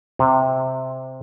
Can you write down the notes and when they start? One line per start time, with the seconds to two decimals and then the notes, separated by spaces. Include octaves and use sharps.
0.19 C3